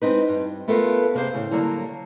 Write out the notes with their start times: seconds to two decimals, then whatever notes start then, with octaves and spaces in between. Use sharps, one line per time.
0.02 G#3 C4 D#4 B4
0.28 G2
0.68 A3 B3 F4 A4 A#4 F5
1.14 C3 A#3 G#4 C5 F5
1.33 A2 C#3
1.51 D3 F#3 G3 A#3